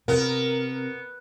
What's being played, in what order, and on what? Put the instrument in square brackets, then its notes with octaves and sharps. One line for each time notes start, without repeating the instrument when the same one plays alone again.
[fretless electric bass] C3 [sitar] B3 [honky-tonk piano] A#4